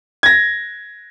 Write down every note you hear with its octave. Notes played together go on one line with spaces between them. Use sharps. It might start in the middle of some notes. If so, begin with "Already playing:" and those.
G#6 A#6